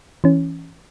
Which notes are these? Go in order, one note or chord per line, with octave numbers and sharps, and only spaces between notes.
E3 C#4